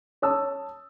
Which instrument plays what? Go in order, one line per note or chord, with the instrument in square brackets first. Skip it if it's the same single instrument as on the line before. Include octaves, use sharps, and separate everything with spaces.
[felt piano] C#5 A5 D#6 E6